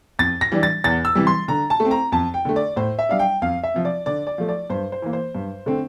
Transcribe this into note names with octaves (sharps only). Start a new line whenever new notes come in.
F2 A6
A#6
E3 G3 D4
A6
E2 A6
E6
C3 E3 G3
C6
D3 A#5
A5
A3
C4
A#5
F2 A5
G5
D3 A3
D5
A2 C5
E5
G3 D4 F5
G5
F2 F5
E5
C3 F3
D5
D3 D5
D5
F3 A3
D5
G2 C5
C5
E3 A#3
C5
G2
D3 A3 C4